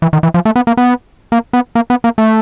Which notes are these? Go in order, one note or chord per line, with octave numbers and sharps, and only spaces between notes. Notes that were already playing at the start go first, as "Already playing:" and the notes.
E3
D#3
E3
F3
A3
B3
A#3
B3
A#3
B3
A#3
B3
A#3
A3